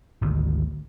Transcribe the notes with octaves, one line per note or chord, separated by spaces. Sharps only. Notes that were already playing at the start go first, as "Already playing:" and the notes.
G#1 D2 D3